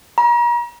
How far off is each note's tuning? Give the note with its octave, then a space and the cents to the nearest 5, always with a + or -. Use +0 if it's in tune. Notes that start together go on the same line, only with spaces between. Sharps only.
A#5 +40